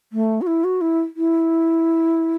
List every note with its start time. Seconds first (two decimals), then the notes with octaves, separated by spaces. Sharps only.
0.13 A3
0.41 F#4
0.47 E4
0.64 F#4
0.81 E4
1.17 E4